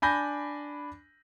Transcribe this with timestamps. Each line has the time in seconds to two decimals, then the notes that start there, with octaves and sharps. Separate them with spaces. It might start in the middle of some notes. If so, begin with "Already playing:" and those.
0.02 D4 G#5 B5 G6 A#6